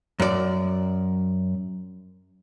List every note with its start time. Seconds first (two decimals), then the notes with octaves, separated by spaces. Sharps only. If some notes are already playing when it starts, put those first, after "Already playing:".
0.20 F#2 D5